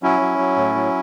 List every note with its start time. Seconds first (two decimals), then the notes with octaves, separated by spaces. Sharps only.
0.03 F#3 C#4 E4
0.21 F#3
0.39 F#3
0.56 A2
0.75 F#3